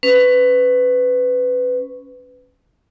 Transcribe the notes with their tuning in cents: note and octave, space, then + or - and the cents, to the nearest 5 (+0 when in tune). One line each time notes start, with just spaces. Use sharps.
C#4 +0 B4 +20